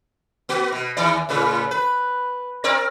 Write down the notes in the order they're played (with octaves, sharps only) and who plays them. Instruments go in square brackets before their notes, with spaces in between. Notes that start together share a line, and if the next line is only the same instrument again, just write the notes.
[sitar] A#3 F#4
B2
D#2 E3 D5
A2 C#3 B4
B4
C4 A#4 D5